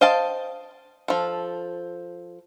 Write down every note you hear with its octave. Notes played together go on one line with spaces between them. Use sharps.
C5 D#5 F5 G5 A5
F3 A4